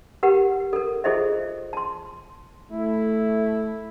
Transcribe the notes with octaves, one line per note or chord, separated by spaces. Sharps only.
G4 A#4 B4 F#5
A4 A#4
F4 G#4 A4 C5 D#5 E5
A5 C6
A3 E4